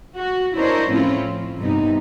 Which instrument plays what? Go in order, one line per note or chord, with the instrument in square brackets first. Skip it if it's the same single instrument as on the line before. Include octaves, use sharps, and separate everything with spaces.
[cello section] F#4
D4 E4 A#4 C5 C#5 D#5
A2 F3 C4 C#4 E4 F4
F3
G2 C3 B3 D#4